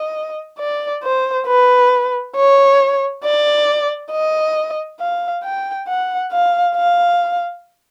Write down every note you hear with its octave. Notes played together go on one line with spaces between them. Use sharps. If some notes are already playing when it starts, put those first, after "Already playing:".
Already playing: D#5
D5
C5
B4
C#5
D5
D#5
F5
G5
F#5
F5
F5